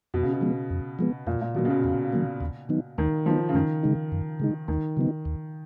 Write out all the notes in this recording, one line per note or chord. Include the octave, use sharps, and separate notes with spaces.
F2 B2
C#3
B2
F3 G#3 B3
F2
F3 G#3 B3
F2 A#2
A#2
B2 D#3 F#3 A#3
C#3
B2
F2
D#3 F#3 A#3
D#2
D#3 F#3 B3 D#4
D#2 D#3
D#3 F3 F#3 B3 D#4
C#3
F#2 D#3
C#3 G#3 D#4
F#2
C#3 G#3 D#4
D#2 D#3
C#3 F#3 B3 D#4
D#2